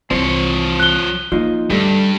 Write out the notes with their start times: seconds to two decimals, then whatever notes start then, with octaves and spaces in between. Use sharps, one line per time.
0.11 C2 E3 F3 C4 C#5
0.80 F#6 G7
1.32 F3 A#3 D#4
1.70 G2 D3 G3 A3